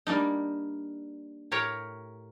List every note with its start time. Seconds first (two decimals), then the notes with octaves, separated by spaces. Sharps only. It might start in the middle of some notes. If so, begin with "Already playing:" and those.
0.07 G3 A#3 D4 D#4
1.51 A2 G4 A#4 C#5 A#5